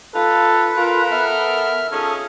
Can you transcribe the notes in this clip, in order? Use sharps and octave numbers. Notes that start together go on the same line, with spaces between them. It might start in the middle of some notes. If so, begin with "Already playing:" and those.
A3 D#4 F4 A4 B4
F4 A4 A#4
B3 E5 F6
C#4 D#4 F4 G#4 A4